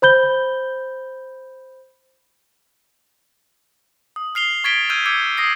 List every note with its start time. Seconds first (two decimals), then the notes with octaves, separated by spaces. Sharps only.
0.02 C5 B5 G6 G7
4.16 D#6
4.35 F6 C7 F7 G7
4.64 C#6 G#6 A6 B6 D7 G7
4.89 E6 F6 G6 G#6 D#7
5.06 D6 E6 G6 G#6 C#7
5.37 D#6 A#6 C7